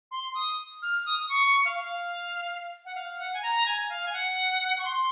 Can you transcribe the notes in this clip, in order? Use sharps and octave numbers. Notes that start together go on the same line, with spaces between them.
C6
D#6
F6
D#6
D#6
C#6
F5
F5
F#5
F5
F#5
G#5
A#5
G#5
F5
G#5
F#5
C#6
C6